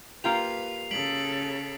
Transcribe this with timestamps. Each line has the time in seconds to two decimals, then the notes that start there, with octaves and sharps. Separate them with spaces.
0.24 A#3 F4 G4 B4 C7 F7
0.91 C#3 A4 B6 D7 F#7